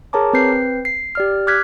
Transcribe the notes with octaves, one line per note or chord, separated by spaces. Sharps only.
G#4 A#4 C#5 A5 A#5 D6
C4 B4 G6 C7
C7
G4 D5 F6
D6 F6 F#6 G#6 B6